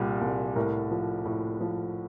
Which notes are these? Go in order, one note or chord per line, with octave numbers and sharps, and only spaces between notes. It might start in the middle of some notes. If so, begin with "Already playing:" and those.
Already playing: C2 A#2 G3
C2
A2 A#4
F3
A2
F3